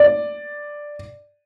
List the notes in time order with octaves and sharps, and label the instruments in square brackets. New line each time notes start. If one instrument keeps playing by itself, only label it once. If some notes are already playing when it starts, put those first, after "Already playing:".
Already playing: [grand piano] D5